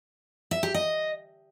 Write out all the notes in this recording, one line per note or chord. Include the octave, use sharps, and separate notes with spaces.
E5
G4
D#5